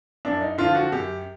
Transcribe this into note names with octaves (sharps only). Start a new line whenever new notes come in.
F#2 D4
D#4
D3 F3 F4
F#4
F#2 G4